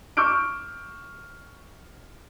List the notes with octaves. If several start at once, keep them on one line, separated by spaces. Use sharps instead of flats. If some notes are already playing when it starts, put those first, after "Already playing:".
C#6 D6 E6 F6 G6 D7